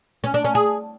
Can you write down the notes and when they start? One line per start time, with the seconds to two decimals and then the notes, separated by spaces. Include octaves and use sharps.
0.24 C#4
0.34 D4
0.44 C#4
0.55 G#4